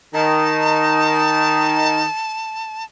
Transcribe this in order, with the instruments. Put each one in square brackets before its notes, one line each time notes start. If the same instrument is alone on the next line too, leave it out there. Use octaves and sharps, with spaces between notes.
[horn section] D#3 D#4 [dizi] A5